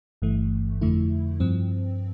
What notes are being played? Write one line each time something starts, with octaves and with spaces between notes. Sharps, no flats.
G1 G2 E3 A3
F2 D3 F3 A3 E4
G2 F3 C4